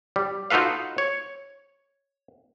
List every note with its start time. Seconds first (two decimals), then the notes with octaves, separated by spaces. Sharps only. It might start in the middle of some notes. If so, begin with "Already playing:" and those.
0.16 G3
0.50 D#4 F4 F#4 A4 B4 F5
0.98 C#5